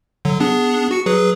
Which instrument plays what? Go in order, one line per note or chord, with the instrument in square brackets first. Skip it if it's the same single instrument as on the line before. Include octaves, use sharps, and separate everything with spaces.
[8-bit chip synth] D3 F#3
B3 D4 G#4
F#4 C#7
F#3 G#4 B4